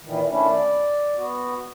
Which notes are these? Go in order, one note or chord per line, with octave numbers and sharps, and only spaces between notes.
A#2 D#3 E3
D#3 A3 C#4 D4 E4
D5
B3 F#4